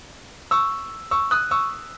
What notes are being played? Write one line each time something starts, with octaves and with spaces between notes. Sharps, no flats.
C#6 E6
C#6 E6
D#6 F#6
C#6 E6